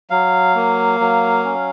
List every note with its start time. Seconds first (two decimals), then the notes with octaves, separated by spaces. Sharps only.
0.10 F#3 F5
0.55 A#3
1.00 F#3
1.44 C#4